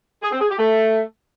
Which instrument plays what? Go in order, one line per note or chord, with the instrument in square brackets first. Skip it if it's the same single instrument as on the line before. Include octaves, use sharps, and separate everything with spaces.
[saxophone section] G#4
C4
G#4
G4
A3